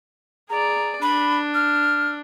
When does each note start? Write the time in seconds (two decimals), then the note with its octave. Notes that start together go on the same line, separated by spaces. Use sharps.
0.50 G#4 D5 A#5
1.02 D4 B5
1.54 F6